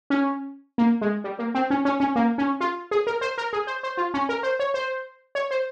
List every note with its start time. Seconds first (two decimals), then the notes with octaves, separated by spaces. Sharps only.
0.10 C#4
0.78 A#3
1.01 G#3
1.24 G3
1.39 A#3
1.55 C4
1.70 C#4
1.85 C#4
2.00 C#4
2.16 A#3
2.38 C#4
2.60 F4
2.91 G#4
3.07 A#4
3.21 C5
3.38 A#4
3.53 G#4
3.67 C5
3.83 C5
3.97 F4
4.14 C#4
4.29 A#4
4.43 C5
4.59 C#5
4.74 C5
5.35 C#5
5.51 C5